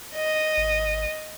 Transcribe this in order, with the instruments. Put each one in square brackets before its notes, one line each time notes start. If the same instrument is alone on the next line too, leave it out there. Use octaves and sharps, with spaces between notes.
[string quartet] D#5
[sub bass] G#1